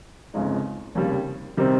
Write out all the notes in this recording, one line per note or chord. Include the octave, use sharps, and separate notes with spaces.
G1 F2 C#3 G#3 D#4
F1 D#2 C#3 G3
C3 D#3 G3 C4